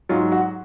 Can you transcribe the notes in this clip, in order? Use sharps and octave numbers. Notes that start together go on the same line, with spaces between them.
G#2 F#3 F4
F#4